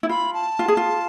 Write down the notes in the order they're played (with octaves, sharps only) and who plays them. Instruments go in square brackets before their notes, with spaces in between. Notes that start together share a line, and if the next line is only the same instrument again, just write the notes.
[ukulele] E4
[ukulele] F4 [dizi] B5
[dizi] A5
[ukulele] F4
G#4
F4